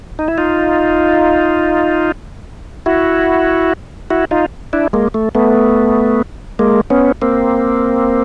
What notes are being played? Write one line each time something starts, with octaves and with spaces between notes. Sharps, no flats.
D#4
E4
D#4 F4
E4 F#4
E4 F#4
D#4 F4
D4 E4
G#3 A#3
A3
A3 B3
G#3 A#3
B3 C#4
A#3 C4